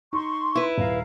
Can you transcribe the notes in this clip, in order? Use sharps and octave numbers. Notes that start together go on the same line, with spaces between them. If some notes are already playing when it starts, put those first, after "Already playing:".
D#4 C6 C#6
E4 B4
D#1 F5 A#5